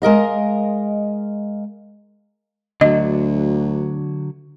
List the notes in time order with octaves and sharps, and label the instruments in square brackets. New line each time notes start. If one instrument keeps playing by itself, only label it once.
[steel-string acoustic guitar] G#3 A#4 D#5 F5
[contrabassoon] D2 [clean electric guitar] D3 F#3 [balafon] D#5